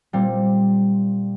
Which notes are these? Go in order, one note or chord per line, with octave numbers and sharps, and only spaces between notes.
A#2 G3 C4